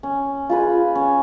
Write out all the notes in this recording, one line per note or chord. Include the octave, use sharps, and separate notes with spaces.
C#4
F4 G#4 B4
C#4